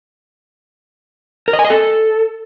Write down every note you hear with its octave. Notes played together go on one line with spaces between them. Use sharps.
A#4
D#5
G#5
D#5
A4